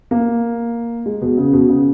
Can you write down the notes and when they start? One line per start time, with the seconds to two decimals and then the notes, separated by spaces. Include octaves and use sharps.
0.11 A#3
1.06 G#3
1.22 B2
1.37 C#3
1.53 B2
1.69 C#3